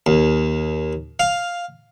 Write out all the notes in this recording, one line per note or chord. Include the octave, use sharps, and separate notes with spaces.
D#2
F5